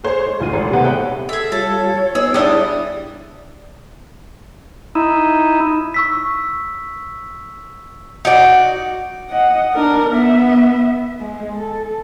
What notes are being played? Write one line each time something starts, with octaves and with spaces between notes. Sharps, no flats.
G#4 C5 C#5
G#3
D2 F4 D#7
G#1
C3 G3 A3 B3 C4
G#4 C#5 E5 F#5 G5 B5
G#4 A4 E5
G3 F4 A4 C#5
B3 D#4 G#4 E6
G3 D4 E4 G#4 F#5 G5 A5 D#6
D#4 E4
C#6 E6 B6
D#4 F#4 D5
D#5 F#5
D4 A#4
B3 E5
G#3
A4